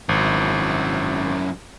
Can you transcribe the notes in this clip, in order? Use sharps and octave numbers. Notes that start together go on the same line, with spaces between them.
G#1 F#2 E4